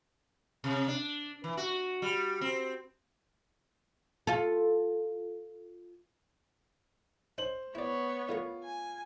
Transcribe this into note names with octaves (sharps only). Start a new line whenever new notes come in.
C3
D4
E3
F#4
G3
C4
F4 A4
C#4 D#4 C5 F#7
B3 E4 C#5 D5
D3 A3 F4 A#4
G#5